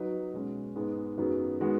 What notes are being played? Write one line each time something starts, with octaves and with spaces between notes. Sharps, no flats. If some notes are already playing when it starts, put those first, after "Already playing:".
Already playing: F#3 D#4 B4
B2 G#3 C#4
G#2 G#3 B3
F#2 D#3 F#3 B3 G#4
D#3 G#3 B3 F#4